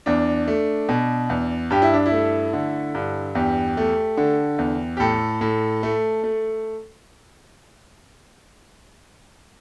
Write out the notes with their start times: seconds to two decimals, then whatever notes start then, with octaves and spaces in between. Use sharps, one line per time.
0.06 E2 D4
0.48 A3
0.89 B2
1.30 E2
1.70 G2 G4
1.82 E4
1.94 D4
2.06 E4
2.12 A3
2.53 D3
2.95 G2
3.35 E2 G4
3.77 A3
4.17 D3
4.59 E2
4.97 G4
5.00 A2 A4
5.41 A2
5.83 A3
6.24 A3